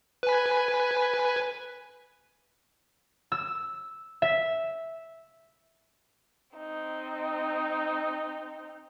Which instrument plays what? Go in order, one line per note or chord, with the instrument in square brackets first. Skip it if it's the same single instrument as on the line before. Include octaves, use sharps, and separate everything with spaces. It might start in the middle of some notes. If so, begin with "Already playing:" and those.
[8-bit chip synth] B4 G#5
[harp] E6
E5
[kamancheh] C4 D#4